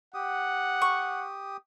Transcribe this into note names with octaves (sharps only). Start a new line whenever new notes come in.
G4 F#5 D#6
C#6